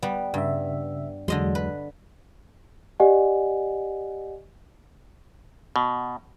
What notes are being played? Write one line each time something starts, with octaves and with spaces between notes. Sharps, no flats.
G3 B3
G2 C#3 E5
E2 D3 F#3 G#3 D#5 C6
B4
G4 D5 D#5 F#5 G#5
B2